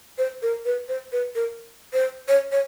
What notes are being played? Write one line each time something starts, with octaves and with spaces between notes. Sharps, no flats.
C5
A#4
B4
C5
B4
A#4
C5
C#5
C#5